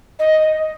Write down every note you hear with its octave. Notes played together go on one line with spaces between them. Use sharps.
D#5